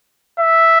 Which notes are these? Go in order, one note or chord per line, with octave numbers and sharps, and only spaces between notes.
E5